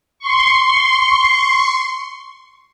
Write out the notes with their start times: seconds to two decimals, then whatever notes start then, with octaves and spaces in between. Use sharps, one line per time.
0.19 C6 C#6